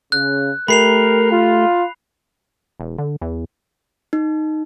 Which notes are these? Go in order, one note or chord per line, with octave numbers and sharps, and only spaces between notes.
C#3 F#6
A3 G4 A#4 B5 C7 F7
F4
E1
D3
E2
D#4